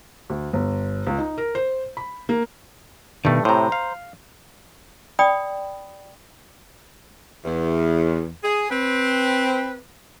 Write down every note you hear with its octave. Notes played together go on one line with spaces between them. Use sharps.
D2
G1
C#2
D#4
A#4
C5
B5
A#3
G2 B2 D#3 A3
A2 C3 C5 A#5
F5
D5 G5 B5 D#6
E2
G#4
C4 B4